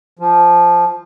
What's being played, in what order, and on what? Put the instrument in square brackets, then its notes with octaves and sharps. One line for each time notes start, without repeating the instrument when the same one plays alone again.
[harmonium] F3